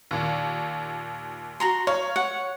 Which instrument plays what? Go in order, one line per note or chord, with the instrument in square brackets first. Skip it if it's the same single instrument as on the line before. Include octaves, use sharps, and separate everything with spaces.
[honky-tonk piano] D#2 A#2
[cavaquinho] F#4 A#5 C6
[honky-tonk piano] C#5 [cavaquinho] F5
[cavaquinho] F#5